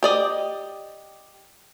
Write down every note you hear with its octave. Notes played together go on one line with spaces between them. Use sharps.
G4 D5 D#5